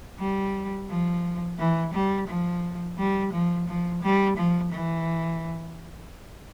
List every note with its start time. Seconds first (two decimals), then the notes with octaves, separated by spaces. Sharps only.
0.19 G3
0.89 F3
1.59 E3
1.94 G3
2.28 F3
2.98 G3
3.33 F3
3.68 F3
4.03 G3
4.36 F3
4.72 E3